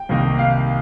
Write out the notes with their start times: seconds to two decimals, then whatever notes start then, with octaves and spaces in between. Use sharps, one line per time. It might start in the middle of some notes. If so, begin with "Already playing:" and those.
Already playing: G5
0.09 C2 C3 D#3 A#3 D#4
0.39 F5